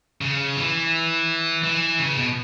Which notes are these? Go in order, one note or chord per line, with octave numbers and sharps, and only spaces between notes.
C#3
E3
E3
C#3
B2